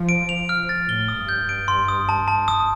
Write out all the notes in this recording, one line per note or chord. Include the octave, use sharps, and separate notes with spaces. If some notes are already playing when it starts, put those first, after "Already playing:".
Already playing: F3
D7
F7
F6
A6
A2 G7
D#6
G2
G6
D7
C6
D#6
A5
A5
D#6